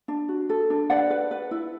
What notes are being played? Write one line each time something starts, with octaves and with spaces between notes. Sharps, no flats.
D4
F#4
A4
D4
B4 D5 F#5
B4
B4
E4